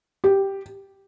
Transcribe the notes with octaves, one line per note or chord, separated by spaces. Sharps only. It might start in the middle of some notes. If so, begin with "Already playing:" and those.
G4